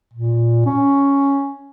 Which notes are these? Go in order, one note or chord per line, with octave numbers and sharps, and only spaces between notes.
A#2
C#4